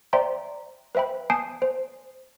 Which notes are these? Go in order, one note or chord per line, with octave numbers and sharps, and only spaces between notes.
C5 D5 E5 G5 A#5 C6
B4 C5 E5 G5 B5
G#5 A5 D#6 G6 C7 D7
C5